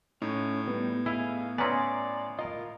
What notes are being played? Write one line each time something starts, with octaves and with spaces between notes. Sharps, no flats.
A2 C#4 D#4
G3 B3
E4 G#4 D#5 F5
B3 C#4 E4 D5 G#5 A#5 C6
D5
F4 A#4 D#5